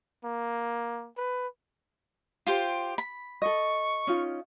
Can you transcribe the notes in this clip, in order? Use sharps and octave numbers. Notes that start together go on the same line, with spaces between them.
A#3
B4
F4 G4 C5
B5
A4 D#5 C#6
C#4 D#4 F4